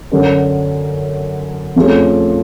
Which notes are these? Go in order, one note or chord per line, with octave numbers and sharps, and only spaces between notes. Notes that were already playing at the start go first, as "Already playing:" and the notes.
F#2 D3 F#3 C#4
F2 F3 A3 C#4 G#4